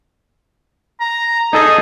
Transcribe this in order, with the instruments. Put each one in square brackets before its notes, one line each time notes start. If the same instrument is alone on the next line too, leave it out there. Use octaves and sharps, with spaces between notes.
[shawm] A#5
[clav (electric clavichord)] D#4 A4 D#5 [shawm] G#4